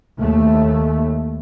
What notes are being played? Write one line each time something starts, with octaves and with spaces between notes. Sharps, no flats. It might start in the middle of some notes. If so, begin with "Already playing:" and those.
D#2 A3